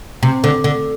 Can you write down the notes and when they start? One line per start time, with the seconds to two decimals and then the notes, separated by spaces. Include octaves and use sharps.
0.23 C3
0.44 D3
0.64 D3